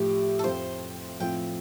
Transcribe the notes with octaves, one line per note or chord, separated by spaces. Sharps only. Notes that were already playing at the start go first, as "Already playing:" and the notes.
Already playing: A2 F3 A3 G4
A4
F2 F3 C4 F4 C5
A2 F3 C4 F4 G5